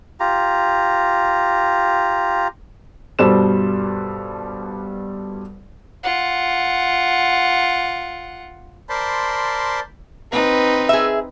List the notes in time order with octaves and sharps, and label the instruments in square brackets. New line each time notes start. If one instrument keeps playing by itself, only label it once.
[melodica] F4 G4 A#5
[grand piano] G2 B2 G3 A4 C5 E7
[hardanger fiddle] F4 F#5
[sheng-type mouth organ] A#4 C5 D5 A5 B5 C6
[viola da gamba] C4 D#4 B4
[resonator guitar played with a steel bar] G#4 E5